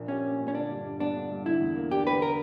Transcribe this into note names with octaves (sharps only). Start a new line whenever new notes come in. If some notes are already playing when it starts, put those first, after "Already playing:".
Already playing: A#1 A#2 A#3 D4
C#4 G4
A#3
A#2
C#4
D3 D4
G2
G3
B3 D4
D3
G2
D3 E4
E2
A#3
D4 G4
D3 B4
A#4